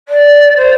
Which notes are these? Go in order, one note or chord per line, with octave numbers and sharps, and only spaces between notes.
D5
C5